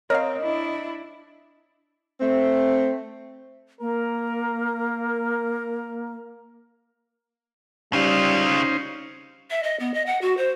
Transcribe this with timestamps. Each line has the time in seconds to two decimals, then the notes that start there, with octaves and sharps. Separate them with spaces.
0.10 C4 A#4 C#5 D#5 F5
0.42 D4 E4
2.21 A3 C4
3.81 A#3 A#4
7.93 C#3 G3 C#4 D#4 F4 C5
9.50 E5
9.63 D#5
9.80 B3
9.94 D#5
10.06 F#5
10.21 F#4
10.37 C5